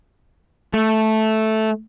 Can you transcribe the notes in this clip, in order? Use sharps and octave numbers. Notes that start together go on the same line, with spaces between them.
A3